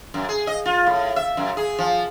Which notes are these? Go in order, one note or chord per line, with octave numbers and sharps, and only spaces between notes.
F#2
G#4
D#5
F4
A2
E5
F#2
G#4
F3